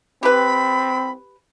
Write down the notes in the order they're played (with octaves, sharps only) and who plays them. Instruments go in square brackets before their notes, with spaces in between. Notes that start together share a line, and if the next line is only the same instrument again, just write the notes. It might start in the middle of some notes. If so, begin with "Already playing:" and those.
[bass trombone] C4 [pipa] G4 B4 [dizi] B5